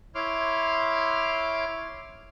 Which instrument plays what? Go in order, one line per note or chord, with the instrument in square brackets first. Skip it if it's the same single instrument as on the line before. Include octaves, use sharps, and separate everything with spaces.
[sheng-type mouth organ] E4 C#5 C6 D6 F6